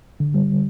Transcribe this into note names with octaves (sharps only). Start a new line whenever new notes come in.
D3
G3